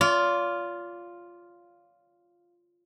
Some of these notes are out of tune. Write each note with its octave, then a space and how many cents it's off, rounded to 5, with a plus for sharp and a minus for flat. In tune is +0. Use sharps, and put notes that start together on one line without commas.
F4 +0 D5 -40